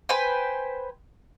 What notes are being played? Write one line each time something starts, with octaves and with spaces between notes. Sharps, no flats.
B4 C5 G5 G#5